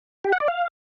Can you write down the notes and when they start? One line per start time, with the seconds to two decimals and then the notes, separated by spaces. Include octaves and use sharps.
0.24 G4
0.32 F#5
0.40 D5
0.48 F5